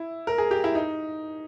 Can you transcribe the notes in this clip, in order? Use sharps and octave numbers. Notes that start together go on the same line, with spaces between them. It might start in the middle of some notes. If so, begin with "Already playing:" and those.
Already playing: E4
A#4
G#4
G4
E4
D#4